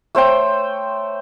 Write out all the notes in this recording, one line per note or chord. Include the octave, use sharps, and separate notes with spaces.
A3 C5 C#5 G5